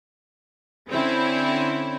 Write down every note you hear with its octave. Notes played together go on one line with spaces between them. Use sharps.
D3 C4 C#4 E4